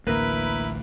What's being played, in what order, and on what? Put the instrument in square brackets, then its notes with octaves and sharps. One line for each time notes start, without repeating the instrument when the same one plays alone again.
[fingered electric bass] A1 D2 A2 [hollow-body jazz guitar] A#3 [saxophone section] E4 A#4 B4